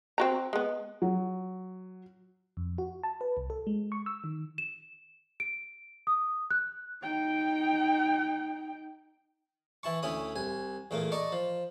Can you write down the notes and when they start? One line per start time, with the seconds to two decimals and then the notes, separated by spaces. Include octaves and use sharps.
0.18 C4 F#4 A#5
0.53 G#3 B3
1.02 F#3
2.57 F2
2.78 F#4
3.03 A5
3.21 B4
3.37 C2
3.50 A4
3.67 G#3
3.92 C#6
4.06 E6
4.24 D#3
4.58 E7
5.40 D7
6.07 D#6
6.50 F#6
7.03 D#4 G5
9.83 E3 E4 A5 C#6
10.03 D2 C#4 E4 B5 D#6
10.36 C2 G#5
10.91 E2 A#2 A3 A#3
11.12 D5 D#5 A5 A#5 C#6
11.32 F3